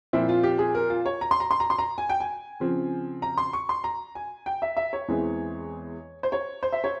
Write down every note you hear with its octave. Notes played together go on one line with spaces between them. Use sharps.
A#2 F3 C4 E4
F4
G4
G#4
A#4
F4
C#5
A#5
C6
A#5
C6
A#5
C6
A#5
G#5
G5
G#5
C#3 F3 C4
A#5
C6
C#6
C6
A#5
G#5
G5
E5
E5
C#5
E2 E3 G#3 C4
C5
C#5
C5
E5
C#5